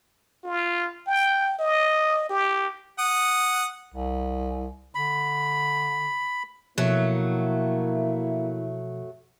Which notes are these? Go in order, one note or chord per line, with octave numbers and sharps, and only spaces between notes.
F4
G5
D#5
G4
F#5 D#6
C2
D3 B5
B2 F3 F#3 A3 A#3 E4